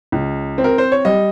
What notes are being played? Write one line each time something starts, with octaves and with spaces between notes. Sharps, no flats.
C#2
C4
A#4
C5
C#5
G3 D#5